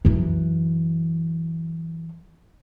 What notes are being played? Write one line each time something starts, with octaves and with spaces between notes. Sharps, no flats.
F#2 E3